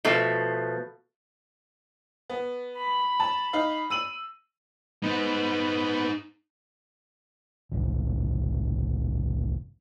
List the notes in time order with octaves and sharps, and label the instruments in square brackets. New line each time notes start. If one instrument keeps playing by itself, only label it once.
[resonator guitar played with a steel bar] B2 F3 A3
[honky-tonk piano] B3
[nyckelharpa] B5
[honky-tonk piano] A5
D#4 F5
E6 D#7 F#7
[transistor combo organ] B3 [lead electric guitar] D#4 C5
[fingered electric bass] F#1 C2